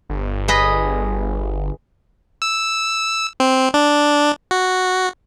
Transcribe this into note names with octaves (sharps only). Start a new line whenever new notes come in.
G1
G#4 B4 D#5
E6
C4
D4
F#4